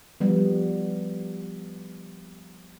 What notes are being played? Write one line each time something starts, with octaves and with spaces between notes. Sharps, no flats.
F3 G3 B3